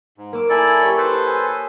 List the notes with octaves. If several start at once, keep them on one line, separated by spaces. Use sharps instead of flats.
G#2
A#3 D6 E6
E4 A4 D5 G#5 A#5
G4 C#5
A4 B4 C5
G#5 D#6